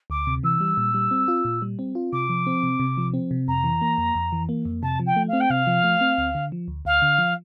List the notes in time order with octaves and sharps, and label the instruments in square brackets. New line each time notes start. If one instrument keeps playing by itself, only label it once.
[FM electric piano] D2 [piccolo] D6
[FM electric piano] C3
[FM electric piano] E3 [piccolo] E6
[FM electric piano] G3
A#2
G3
C4
F4
A#2
G3
C4
F4
[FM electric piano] C3 [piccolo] D6
[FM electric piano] F3
C4
C3
C3
F3
C4
C3
[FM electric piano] F2 [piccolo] A#5
[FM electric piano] E3
A#3
F2
F2
E3
A#3
F2
[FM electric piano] C3 [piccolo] A5
[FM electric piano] F3
[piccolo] G5
[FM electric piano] A3
[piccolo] F5
[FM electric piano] C4
[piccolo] G5
[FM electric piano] C3 [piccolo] F5
[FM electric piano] F3
A3
C4
D2
D3
F3
D2
[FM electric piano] D2 [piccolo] F5
[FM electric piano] D3
F3